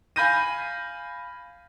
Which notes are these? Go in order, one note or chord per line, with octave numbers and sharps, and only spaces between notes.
F5 G#5 B5 G6 A#6 D#7